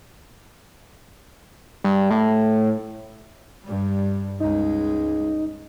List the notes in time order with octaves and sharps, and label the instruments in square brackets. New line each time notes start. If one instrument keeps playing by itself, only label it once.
[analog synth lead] G2
A2
[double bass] G2 G3
[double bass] C#2 G#3 [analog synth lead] D#4